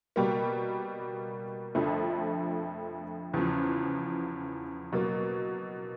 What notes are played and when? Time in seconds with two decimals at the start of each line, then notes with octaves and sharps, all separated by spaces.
0.16 B2 G3 A#3
1.75 F2 D3 F3 A3
3.34 E2 C#3 F3
4.93 B2 F#3 A#3